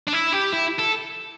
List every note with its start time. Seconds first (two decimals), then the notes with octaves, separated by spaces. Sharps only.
0.08 D4
0.14 E4
0.33 G4
0.53 E4
0.79 A4